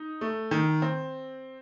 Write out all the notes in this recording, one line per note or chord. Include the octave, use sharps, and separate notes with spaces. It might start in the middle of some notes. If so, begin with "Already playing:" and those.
Already playing: D#4
A3
D#3
C4